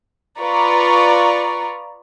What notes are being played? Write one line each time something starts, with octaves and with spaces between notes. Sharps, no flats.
F4 B4 D5 A#5 C#6